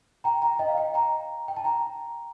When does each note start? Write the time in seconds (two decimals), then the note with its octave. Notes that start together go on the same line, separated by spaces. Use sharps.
0.24 G5 A#5
0.42 G5 A#5
0.59 D#5 G5
0.68 F5
0.77 D#5 G5
0.94 G5 A#5
1.48 G5
1.57 A5
1.64 G5 A#5